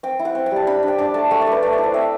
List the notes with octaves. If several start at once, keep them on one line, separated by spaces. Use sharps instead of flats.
C4 G5
E4
F#5
C4
G5
G3 A5
D4 B5
D4
G5
D4 A5
A3 A5
A3 G5
D5
A3 B4
A3 D5
D5
E4
C5
C4 E5